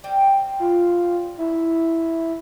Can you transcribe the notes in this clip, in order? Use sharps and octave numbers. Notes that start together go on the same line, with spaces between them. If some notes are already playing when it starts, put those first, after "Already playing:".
G3 C4
F4
E4